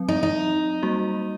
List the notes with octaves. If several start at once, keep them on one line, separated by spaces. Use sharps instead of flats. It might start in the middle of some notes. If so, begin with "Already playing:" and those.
Already playing: F#3 C4
D#4
D#4
G3 A#3 F#4